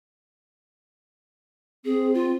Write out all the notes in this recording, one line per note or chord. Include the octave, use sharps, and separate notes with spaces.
C4 G#4
F4